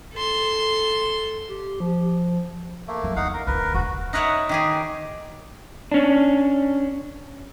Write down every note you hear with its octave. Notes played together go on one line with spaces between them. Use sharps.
A4 C6
G4
F3
A3 A#3
E3 F#3
E2 D#4 F5 F#5
A#4
D1 D2 A#4 B4
E1 F#4
D#4 A#4 B4 C#5 E5 F#5
D#3 G4 G#4
C#4 D4